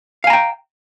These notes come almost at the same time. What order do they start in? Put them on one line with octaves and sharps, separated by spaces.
F5 G#5 A#5 G5